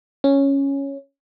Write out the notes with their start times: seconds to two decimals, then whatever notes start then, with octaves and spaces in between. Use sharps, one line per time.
0.24 C#4